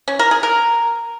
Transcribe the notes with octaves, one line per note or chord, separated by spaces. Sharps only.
C#4
A#4
G#4
A#4